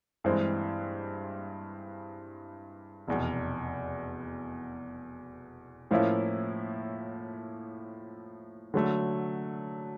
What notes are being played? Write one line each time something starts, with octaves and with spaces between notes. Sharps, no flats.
G2 E3 G#3 C4
F1 E2 B2
A2 F3 A#3 C#4 E4
D3 F#3 A3